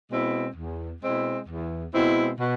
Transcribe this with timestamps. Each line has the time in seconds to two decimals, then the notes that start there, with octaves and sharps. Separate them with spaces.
0.12 B2 G#3 C4 E4
0.56 E2
1.03 B2 G#3 C4 E4
1.49 E2
1.94 B2 G#3 C4 E4
2.40 B2